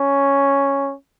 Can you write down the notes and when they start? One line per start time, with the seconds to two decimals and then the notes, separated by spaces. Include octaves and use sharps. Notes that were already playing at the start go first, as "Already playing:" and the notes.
Already playing: C#4